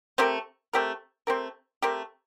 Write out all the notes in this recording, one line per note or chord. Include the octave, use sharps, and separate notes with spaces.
A3 C4 G4 A#4
A3 C4 G4 A#4
A3 C4 G4 A#4
A3 C4 G4 A#4